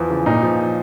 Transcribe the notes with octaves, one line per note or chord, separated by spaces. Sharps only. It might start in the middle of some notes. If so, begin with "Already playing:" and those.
Already playing: E2 F3
C#3
A#2 D#4
F3